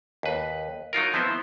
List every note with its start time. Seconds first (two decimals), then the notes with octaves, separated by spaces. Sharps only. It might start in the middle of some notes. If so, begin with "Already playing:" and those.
0.23 D#2 B4
0.93 F#3 D#4 F4 A#4
1.14 F3 B3 C4 E4 C5